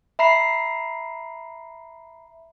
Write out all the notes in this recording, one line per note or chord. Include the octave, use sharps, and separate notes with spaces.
E5 A#5 B5 C7